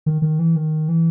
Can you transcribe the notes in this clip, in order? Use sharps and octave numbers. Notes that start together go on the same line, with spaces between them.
D#3
D#3
E3
D#3
E3